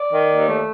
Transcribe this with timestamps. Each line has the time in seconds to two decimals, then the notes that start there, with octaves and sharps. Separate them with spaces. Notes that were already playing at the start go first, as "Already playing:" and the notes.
Already playing: D5
0.12 D#3
0.30 D#2
0.48 A3